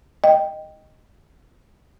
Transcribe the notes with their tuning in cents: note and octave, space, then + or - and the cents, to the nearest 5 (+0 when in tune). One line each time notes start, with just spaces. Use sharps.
D#5 -5 G5 +0